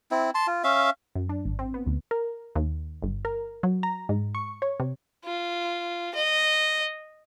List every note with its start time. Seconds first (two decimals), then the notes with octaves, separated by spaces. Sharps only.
0.11 C4 E4
0.35 A5 C6
0.47 F4
0.64 C#4 E5 F5
1.15 F#2
1.29 D4
1.45 G#1
1.59 C4
1.74 B3
1.86 D2
2.11 A#4
2.55 D#2
3.03 G1
3.25 A#4
3.63 F#3
3.83 A#5
4.09 G#2
4.35 C#6
4.62 C#5
4.80 C3
5.25 F4
6.15 D#5